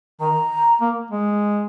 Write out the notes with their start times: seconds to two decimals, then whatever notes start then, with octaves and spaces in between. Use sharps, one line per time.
0.21 D#3 A#5
0.81 A#3
1.11 G#3